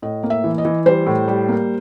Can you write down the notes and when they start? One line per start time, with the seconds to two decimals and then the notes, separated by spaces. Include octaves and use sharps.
0.02 A2 D#5
0.23 A#3
0.30 E5
0.44 E3
0.58 D#5
0.65 E3
0.86 G3 C5
1.06 A2
1.28 G3
1.49 A#3